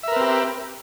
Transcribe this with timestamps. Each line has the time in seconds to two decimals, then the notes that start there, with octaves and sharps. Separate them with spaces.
0.03 E5
0.08 A#4
0.12 B4
0.16 C4
0.21 G4